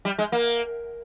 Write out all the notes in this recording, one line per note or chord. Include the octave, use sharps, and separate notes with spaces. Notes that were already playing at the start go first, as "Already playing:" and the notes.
G3
G#3
A#3